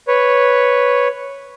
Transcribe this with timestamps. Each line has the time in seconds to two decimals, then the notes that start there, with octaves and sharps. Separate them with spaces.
0.08 B4 C#5